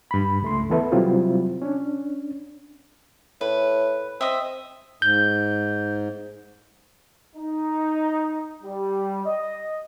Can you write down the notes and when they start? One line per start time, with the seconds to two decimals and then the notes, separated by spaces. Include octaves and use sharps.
0.11 G2 B5
0.42 C#2 A3 C6
0.70 E3 B3 A4 B4 E5
0.92 C3 F#3 G3 C4 E4 F4
1.62 C#4 D4
3.41 A2 B4
4.21 C4 D#5 E5
5.02 G#2 G6
7.36 D#4
8.63 G3
9.26 D#5